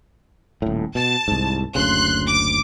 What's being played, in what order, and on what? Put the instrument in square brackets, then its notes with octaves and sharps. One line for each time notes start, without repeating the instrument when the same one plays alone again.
[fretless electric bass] D#1 A2
[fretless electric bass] B2 [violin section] A5
[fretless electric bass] C2 G#2
[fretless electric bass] F#1 D2 C#3 [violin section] C6 F#6
[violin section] D6